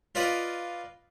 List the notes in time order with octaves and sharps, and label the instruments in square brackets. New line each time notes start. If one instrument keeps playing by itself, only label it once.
[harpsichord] F4 B4 D5 D#5